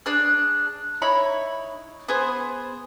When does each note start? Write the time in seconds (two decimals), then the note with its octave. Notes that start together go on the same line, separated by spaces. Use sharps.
0.06 D4 G#4 F#6
1.02 D#4 E4 C#5 B5
2.08 B3 G#4 C5